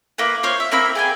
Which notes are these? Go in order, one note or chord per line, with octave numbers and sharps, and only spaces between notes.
A#3 E4 B4
F4 C5 C#5
E5
A#3 C4 E4 B5
G#4 G5 G#5